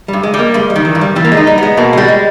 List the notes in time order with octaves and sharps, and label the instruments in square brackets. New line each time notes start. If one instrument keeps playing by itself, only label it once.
[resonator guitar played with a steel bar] G2 [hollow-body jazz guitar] G3
[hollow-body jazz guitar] G#3
[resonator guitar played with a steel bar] G3
[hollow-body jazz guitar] A#3
[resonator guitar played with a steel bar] G2 [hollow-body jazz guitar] G#3
[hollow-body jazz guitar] G3
[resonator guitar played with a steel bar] D#3
[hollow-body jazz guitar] E3
[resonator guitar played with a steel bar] G2
[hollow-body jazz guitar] G3
[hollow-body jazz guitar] E3 [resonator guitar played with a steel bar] G3
[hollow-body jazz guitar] A#3
G#3
[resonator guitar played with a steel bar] D#4
[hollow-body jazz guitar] G3
[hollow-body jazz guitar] G#3 [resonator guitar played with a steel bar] B3
[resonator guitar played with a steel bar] B2 [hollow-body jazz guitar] A#3
[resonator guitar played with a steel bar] G3 [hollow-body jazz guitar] G#3
[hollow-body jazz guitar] G#3